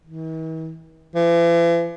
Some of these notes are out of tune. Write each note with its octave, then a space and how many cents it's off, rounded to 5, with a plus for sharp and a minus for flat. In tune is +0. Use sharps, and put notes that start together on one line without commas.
E3 -45
E3 +45